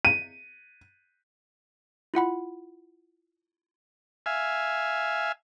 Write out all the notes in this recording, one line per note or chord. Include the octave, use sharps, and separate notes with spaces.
D#7
E4 F4 F#5 B5
E5 F5 G#5